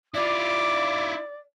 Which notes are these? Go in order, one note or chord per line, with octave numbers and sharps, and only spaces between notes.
E4 F4 D5 D6